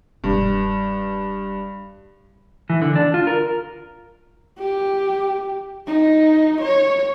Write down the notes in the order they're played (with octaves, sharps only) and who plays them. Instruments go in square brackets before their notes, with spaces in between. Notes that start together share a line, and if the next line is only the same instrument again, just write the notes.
[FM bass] E1 [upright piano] G2
[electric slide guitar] E3
D3
D4
F4
A#4
[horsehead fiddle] G4
D#4
C#5